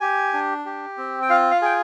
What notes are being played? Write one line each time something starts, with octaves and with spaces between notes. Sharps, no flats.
G4 G#5
D4
G4
C4
G5
F4 F5
F5
G#4 G5